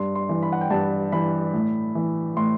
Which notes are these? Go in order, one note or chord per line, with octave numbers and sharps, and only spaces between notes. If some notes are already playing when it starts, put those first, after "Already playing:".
Already playing: G2 C6
C6
E3
B5
F#5
G5
G2 A5
E3 B5
A2
E3
A2 C6